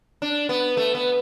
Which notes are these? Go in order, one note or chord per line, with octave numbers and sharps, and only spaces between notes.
D4
B3
A3
B3